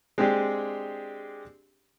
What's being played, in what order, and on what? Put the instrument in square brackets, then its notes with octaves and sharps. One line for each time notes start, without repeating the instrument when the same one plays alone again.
[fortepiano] G#3 C4 D4 G4 G#4